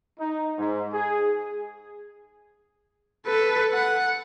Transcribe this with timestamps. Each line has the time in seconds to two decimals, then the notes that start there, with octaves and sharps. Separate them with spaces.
0.19 D#4
0.58 G#2
0.93 G#4
3.26 A4 B4
3.73 F#5